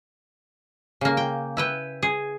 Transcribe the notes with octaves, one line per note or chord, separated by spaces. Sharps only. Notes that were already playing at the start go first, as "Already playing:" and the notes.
C#3 A#3
G5
E4 B4 G5
G#4